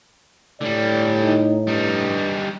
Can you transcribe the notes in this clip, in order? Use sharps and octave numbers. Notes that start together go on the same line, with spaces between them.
A2 D3 G3 D5
D#4
G2 G3 D#4